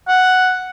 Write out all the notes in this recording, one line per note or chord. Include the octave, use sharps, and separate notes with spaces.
F#5